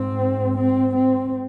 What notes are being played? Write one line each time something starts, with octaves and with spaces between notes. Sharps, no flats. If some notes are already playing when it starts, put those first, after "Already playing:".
Already playing: G#2 C4
C4
C4